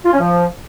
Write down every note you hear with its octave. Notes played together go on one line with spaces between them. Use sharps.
F4
C#4
F3